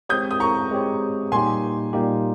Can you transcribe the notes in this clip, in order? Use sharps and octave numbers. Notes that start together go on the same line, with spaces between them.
G#3 C4 G4 C#5 D#6 G6
D#6
A#5 C#6
G#3 C4 G4 C#5
A#2 G3 A#3 D#4 G4 G#5 C6
A#2 G3 A#3 D#4 G4